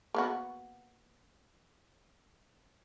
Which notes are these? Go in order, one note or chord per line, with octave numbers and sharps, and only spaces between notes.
A#3 B3 F#4